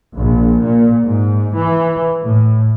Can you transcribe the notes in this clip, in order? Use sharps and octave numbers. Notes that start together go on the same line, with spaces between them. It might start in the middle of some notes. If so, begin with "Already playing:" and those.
A#1
A#2
G#2
E3
A2